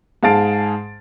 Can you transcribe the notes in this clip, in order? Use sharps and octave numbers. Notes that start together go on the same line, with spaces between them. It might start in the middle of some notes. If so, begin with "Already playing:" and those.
G#2 G#4 F5 A5 A6 D7